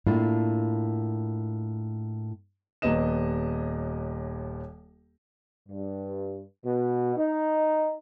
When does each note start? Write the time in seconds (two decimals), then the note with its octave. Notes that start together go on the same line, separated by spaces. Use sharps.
0.07 A2 A#3 D4 E4 F4
2.82 D#1 D#2 B3 D#5 E7
5.69 G2
6.65 B2
7.17 D#4